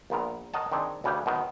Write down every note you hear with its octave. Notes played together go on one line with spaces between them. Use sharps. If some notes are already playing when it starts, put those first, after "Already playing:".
A#1 A#2 B3 A#4
A#4 C#5 D#5 F#5 A5
D#3 C4 D4 G#4
D2 C#3 C#4 G4 B4
F#2 B2 D#3